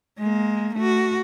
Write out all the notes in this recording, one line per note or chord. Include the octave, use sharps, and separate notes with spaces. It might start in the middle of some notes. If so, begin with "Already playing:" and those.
G#3 A#3
A3 F#4